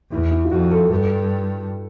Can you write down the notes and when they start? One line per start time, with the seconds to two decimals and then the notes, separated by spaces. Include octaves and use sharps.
0.11 E2 E4
0.31 E4
0.45 F4
0.51 F2 F#4
0.71 A4
0.90 G2 A4